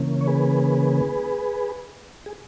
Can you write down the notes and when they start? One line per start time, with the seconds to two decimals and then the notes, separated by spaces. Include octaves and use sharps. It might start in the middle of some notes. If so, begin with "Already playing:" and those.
Already playing: C#3 E3 A#3 C#4
0.21 C#5
0.27 G#4 B4
2.26 G#4